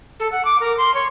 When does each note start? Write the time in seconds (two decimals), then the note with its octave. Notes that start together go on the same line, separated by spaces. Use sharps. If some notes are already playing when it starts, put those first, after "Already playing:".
0.20 A4
0.32 F#5
0.45 D6
0.60 A#4
0.78 C6
0.94 C#5